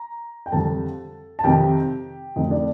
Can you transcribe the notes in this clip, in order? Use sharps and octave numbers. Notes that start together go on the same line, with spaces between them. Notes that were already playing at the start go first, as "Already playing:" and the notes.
Already playing: A#5
G5
F2 D3 G3 A4 A5
A5
F2 C3 D#3 G4 G5
F2 D3 A3 C4 D#4 D#5
D4 D5